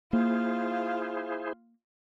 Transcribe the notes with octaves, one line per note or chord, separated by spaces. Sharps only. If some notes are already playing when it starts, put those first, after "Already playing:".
A#3 E4 F4 G#4 C5 F5